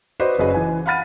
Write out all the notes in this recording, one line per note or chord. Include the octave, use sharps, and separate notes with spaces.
F#4 B4 C5 D5 D#5
F#1 C#4 F#4 G#4 B4 D#5
E3 G#5
F5 F#5 B5 F6 A6 D#7